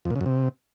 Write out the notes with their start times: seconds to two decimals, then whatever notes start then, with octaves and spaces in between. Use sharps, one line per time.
0.05 F2
0.10 A#2
0.16 C#3
0.21 F#2
0.26 C3